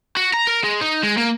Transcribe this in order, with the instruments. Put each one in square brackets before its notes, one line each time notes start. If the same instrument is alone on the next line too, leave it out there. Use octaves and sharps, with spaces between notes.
[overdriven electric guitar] F#4
A#5
A#4
G#3
D#4
G#3
A#3